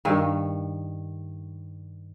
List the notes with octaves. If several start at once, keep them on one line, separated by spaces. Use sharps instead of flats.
G2 D#3